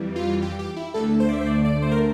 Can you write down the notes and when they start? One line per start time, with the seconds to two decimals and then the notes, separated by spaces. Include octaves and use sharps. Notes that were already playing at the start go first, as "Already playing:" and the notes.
Already playing: F2 E3 G3
0.16 F4
0.42 G4
0.59 G4
0.76 E4
0.94 D2 D3 A3 A4
1.20 C5
1.29 D5
1.33 E5
1.41 C5
1.46 D5
1.65 D5
1.82 C5
1.91 A#4